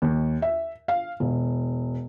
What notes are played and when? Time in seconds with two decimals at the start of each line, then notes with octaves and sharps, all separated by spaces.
0.02 D#2
0.42 E5
0.88 F5
1.20 E1